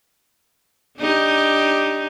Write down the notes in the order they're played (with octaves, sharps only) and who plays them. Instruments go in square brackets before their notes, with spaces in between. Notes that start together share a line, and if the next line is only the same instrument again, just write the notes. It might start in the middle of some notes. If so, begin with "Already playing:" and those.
[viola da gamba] D4 D#4 G4